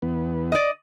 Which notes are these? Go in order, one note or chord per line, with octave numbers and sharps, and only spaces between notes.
E2 B3
D5 D#5